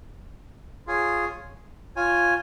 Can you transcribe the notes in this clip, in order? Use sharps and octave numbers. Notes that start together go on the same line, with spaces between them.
F4 G#4 C#5 G#5
F4 C#5 G#5